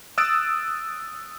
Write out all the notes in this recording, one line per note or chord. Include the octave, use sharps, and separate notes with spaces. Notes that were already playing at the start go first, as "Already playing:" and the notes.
D#6 E6 F#6 A6 D7